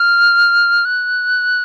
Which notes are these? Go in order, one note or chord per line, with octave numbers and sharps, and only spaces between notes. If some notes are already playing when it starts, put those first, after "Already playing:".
Already playing: F6
F#6